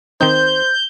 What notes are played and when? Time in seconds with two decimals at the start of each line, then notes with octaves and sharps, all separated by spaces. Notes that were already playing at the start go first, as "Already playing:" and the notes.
0.21 D#3 C4 D#4 C5 G6